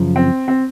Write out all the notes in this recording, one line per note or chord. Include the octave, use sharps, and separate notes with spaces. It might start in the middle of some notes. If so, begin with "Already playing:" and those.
Already playing: F#2 C#3 F3
C4
C4